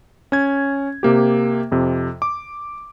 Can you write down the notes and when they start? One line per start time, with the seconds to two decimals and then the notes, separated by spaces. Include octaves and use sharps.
0.32 C#4 G#6
1.03 C3 A#3 G4
1.71 F2 C3
2.22 D6